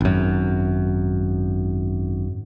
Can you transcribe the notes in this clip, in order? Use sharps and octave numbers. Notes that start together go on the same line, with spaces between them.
G#1 F#2